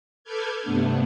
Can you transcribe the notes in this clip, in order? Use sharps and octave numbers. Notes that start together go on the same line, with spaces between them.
A4 B4 D6 F6 G6 G#6
G2 C3 A3 B3 D4